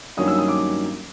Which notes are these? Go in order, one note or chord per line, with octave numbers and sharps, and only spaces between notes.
G2 D#3 F#3 A#3 C#4 D#6
E6
D#6
D6